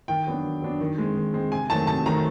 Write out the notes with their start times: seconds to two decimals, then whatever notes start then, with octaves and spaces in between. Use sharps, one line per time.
0.08 D#3 G5
0.27 F#3 B3 D4
0.45 D#3
0.62 F#3 B3 D4
0.80 D#3
0.98 G#3 C4
1.16 D#3
1.34 G#3 C4
1.52 C3 G#5
1.70 D#3 F#3 A3 C4 A5
1.87 C3 A5
2.06 D#3 F#3 A3 C4 A#5